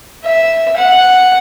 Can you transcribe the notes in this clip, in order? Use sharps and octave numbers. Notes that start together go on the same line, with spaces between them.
E5
F#5